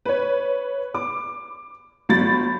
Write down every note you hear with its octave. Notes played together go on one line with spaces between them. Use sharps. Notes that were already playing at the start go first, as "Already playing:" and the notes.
B4 C#5
D6
G1 F#3 B5 A6